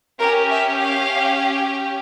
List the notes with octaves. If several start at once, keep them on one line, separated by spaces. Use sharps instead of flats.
C#4 G4 A#4
E5
F5